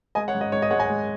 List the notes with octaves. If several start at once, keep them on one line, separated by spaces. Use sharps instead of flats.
G#3 D#5 G#5
C#5 F#5
G#2
D#5
G#2 C#5
D#5
G#3 C#5 F#5
D#5 G#5
G#3